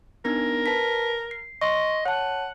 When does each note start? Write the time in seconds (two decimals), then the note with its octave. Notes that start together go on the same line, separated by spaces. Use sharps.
0.25 B3 D4 D#4 A#4
0.66 B4 A5 B6
1.31 C7
1.61 D#5 C6 C#6
2.06 C#5 F#5 A5